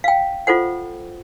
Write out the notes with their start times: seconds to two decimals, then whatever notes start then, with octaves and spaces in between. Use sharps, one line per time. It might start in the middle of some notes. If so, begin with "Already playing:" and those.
0.04 F5 G5
0.47 F4 A4 C5 F#5